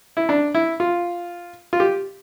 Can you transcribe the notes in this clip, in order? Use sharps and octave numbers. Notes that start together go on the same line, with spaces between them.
E4
D4
E4
F4
F4
G4